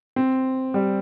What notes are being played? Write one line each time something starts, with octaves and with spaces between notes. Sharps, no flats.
C4
G3